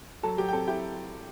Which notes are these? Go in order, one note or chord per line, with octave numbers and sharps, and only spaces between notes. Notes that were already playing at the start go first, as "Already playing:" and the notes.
F#3 A4 A5
F#3 G4 G5
G5
C4 A4 A5
E4 G4 G5